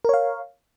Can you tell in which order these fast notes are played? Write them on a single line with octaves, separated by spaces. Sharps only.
A#4 C#5 F5